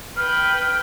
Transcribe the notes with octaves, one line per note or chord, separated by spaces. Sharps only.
B4 G5 F6